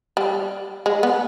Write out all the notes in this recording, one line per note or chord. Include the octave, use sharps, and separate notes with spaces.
G3
G#3
B3